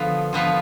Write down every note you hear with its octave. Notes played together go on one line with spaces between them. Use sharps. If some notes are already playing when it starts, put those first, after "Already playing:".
Already playing: D3 F3 B3 F4
D3 F3 B3 F4